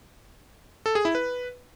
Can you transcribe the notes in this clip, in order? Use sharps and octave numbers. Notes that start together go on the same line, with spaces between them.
A4
G#4
E4
B4